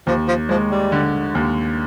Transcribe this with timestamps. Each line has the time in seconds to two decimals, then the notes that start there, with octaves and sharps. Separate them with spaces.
0.07 D#2 F3
0.28 F3
0.49 F3 G#3
0.71 G3
0.92 D3
1.35 D#2